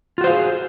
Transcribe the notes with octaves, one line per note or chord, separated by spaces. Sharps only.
F4 F#4 G#4 C5 F5